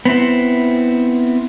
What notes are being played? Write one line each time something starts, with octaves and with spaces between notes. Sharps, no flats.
B3 C4 E4